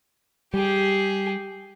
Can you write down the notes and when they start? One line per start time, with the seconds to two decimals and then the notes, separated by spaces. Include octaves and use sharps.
0.54 G3 G4 G#4